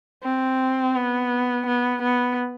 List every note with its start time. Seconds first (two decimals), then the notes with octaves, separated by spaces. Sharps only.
0.23 C4
0.95 B3
1.67 B3
2.03 B3